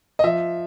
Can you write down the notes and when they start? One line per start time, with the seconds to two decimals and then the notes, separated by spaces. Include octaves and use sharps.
0.19 D#5
0.24 F3 E5